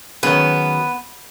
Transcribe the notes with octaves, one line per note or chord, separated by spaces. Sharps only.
D#3 F#3 B3 C#4 G#4